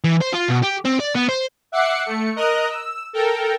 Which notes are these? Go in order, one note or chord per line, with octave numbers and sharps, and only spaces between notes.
E3
C5
F4
B2
G4
C4
D5
B3
C5
E5 F#5 D6 F#6 C7 C#7
A3 C#7
A#4 D#5 A#5 D#6 F#6
E6
A4 A#4 G5